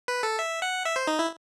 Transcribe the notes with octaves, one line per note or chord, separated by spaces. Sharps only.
B4
A4
E5
F#5
E5
C5
D#4
E4